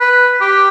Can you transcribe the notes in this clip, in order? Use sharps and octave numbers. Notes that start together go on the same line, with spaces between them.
B4
G4